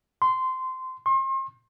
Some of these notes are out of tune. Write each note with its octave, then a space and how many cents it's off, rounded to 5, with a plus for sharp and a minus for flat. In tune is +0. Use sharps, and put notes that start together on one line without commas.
C6 -15
C6 +40